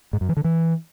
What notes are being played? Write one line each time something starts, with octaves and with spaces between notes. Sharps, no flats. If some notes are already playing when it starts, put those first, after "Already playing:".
G#2
F#2
E3
D3
E3